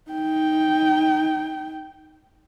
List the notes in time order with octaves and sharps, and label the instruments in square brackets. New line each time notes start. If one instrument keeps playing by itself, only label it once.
[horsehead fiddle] D#4 G5